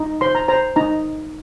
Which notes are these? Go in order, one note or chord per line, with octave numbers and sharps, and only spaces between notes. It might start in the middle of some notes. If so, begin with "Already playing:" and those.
Already playing: D#4
C5 C6
A#5
C5 A#5
D#4 A#5